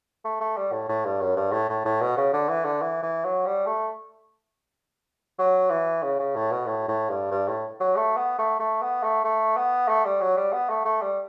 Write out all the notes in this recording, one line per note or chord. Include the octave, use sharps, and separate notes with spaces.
A3
A3
G3
A2
A2
G2
F#2
G2
A2
A2
A2
B2
C#3
D3
E3
D3
E3
E3
F#3
G3
A3
F#3
E3
C#3
C#3
A2
B2
A2
A2
G2
G2
A2
F#3
A3
B3
A3
A3
B3
A3
A3
B3
A3
G3
F#3
G3
B3
A3
A3
G3